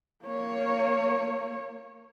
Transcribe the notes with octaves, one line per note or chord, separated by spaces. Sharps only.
A#3 C#5